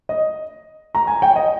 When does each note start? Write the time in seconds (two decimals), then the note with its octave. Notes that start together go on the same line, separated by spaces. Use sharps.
0.09 D#5
0.95 A#5
1.07 G#5
1.22 G5
1.36 D#5